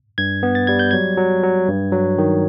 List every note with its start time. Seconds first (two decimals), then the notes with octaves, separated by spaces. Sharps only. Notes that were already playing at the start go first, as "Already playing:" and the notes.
0.18 G2 G#6
0.43 B3
0.55 A6
0.67 G3 G#6
0.79 G6
0.91 F#3 G#6
1.17 F#3
1.43 F#3
1.68 G2
1.92 F#3
2.18 D#3